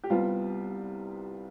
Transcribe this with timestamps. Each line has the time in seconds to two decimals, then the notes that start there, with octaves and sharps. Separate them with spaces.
0.03 G4
0.10 C2 C3 G3 B3 F4